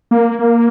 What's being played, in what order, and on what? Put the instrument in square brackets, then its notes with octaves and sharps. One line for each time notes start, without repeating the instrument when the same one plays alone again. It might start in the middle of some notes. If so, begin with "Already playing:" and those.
[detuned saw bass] A#3
A#3